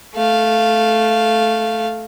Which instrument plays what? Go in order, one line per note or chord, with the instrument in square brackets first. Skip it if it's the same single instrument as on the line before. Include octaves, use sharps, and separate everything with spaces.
[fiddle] A3 F5